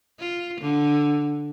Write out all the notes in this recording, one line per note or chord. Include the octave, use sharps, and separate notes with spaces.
F4
D3